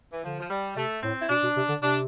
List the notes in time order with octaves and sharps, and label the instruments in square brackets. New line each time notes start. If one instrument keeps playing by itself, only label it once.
[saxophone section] E3
[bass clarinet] D3 [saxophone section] F3
[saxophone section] F3
G3
[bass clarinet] C3 [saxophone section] A3
[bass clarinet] A2 [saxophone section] C4
[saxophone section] E4
[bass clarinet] B2 [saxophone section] D4
[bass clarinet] B2
C3
D3
[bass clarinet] C3 [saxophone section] D4